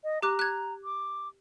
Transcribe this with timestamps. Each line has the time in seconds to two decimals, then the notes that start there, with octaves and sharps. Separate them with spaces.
0.04 D#5
0.22 G4 A#5 D6 F#6
0.39 F#6 G#6
0.84 D6